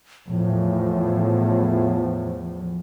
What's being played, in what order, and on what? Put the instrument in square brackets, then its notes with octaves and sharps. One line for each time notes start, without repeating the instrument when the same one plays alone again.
[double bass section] E2 A2 [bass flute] F3